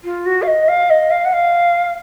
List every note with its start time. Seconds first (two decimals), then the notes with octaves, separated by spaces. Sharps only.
0.04 F4
0.25 F#4
0.42 F5
0.47 D#5
0.68 F5
0.89 D#5
1.10 F5
1.24 F#5
1.32 F5